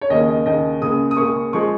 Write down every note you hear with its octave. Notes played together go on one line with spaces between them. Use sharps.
C#5
D#2 C#3 A#3 D#5
D#5
D#2 C#3 A#3 D#5
C#2 C#3 A#3 D#6
D#6
C#2 C#3 A#3 C#6
F3 G#3 C#6